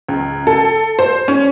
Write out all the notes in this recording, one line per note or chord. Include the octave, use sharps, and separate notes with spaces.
C#2
A4
C5
C#4